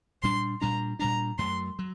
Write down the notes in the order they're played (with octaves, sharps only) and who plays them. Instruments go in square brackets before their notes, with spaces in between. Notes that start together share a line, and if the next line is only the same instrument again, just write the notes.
[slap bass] A#2 G3 D4 [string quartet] C6
[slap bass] A#2 G3 D4 [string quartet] A#5
[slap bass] A#2 G3 D4 [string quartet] A#5
[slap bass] F#2 F#3 A3 [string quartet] C6
[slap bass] F#3